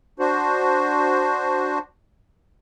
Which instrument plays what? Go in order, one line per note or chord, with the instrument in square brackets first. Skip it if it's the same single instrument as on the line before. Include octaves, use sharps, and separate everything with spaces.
[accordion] D4 F#4 C5